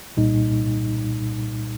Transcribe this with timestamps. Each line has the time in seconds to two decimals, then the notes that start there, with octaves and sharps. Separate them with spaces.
0.17 C2 A#2 G3 D#4